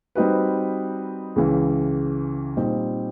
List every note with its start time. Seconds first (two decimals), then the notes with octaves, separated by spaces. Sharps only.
0.15 G3 C4 D#4 F#4 B4
1.36 C#2 C#3 E3
2.57 A#2 G3 C4 D#4